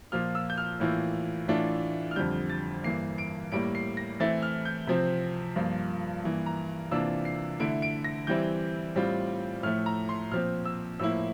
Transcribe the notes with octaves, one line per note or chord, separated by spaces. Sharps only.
A#2 F3 A#3 F4 F6
E6
G6
F6
A2 E3 A#3 F4
A2 E3 A3 D4 F4
F6
F2 D3 G3 G6
A6
G2 E3 A#3 C7
D7
A2 G3 A#3 D7
C7
A#6
E3 A3 C4 E4 A6
F6
G6
C3 F3 C4
G2 F3 A#3 F4
G2 E3 A#3
A#5
C3 E3 A#3 D4 F4 E6
C7
D3 A3 E4 D7
D7
A#6
E3 G3 C4 E4 G6
A2 G3 C4 F4
A2 F3 A3 F6
A#5
C6
A#2 F3 C4 F6
E6
A2 F3 A#3 E4 E6